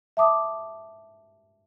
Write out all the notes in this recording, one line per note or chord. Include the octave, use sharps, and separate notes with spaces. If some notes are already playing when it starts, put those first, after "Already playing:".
E5 A5 D6 D#6